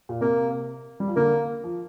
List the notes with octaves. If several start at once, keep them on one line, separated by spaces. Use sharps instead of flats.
A#2
C3 A#3
G3
F3
D3 A#3
F3